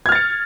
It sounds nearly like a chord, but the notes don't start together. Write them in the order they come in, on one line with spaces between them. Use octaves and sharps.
G#6 F6 A6 C#7